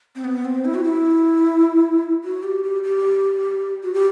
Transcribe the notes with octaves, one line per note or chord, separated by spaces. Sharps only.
C4
B3
C4
E4
F#4
E4
F#4
G4
G4
G4
F#4
G4